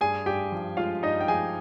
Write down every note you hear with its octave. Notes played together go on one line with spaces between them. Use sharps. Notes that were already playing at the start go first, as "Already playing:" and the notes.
G2 G#4 G#5
G2 G4 G5
F3
G#3 F4 F5
G2 D#4 D#5
G5
F3 G#4 G#5